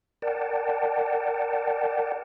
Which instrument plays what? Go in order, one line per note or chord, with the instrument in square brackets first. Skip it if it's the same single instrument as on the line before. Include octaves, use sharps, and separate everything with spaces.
[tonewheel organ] A#4 D5 F#5 G5 A5